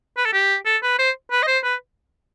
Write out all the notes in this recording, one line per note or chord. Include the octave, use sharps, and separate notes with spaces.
B4
A4
G4
A4
B4
C5
B4
D#5
C5
B4